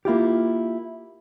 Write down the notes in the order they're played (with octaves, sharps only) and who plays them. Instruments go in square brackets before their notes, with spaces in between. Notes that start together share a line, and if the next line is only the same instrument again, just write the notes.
[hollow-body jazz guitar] A#3 E4 F4 G4